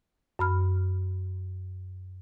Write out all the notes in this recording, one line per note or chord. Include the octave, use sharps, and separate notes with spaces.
F#2 B5 F6